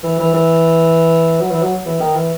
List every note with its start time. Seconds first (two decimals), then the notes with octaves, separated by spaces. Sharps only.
0.04 E3
0.19 E3
0.34 E3
1.40 F#3
1.51 E3
1.62 F#3
1.86 E3
2.00 D#3
2.15 E3